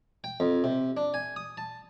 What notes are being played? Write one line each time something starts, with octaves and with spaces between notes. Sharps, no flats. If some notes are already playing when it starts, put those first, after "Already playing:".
G5
F2
C3
D4
G#5
D#6
A5